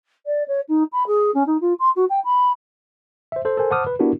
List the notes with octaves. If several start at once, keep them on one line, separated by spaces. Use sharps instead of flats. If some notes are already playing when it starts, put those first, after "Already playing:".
D5
C#5
D#4
B5
G#4
C#4
D#4
F4
C6
F#4
G5
B5
C5 E5
A4 C5
A4 A#4 C5 G#5
C5 F#5 A5 D6 D#6 F6
B4
B3 D4 E4 F#4 G4 A#4